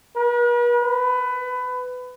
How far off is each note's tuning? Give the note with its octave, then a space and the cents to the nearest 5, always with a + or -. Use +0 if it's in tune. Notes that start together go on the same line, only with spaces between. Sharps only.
B4 -45
B4 +20